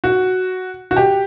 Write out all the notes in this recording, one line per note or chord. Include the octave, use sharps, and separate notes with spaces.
F#4
F#4
G4